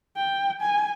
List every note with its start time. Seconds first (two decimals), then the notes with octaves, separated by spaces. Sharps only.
0.16 G5
0.62 G#5